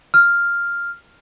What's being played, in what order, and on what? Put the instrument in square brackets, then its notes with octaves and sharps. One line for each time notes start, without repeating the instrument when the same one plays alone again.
[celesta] F6